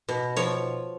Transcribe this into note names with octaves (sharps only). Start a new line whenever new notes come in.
B2
F3 C#5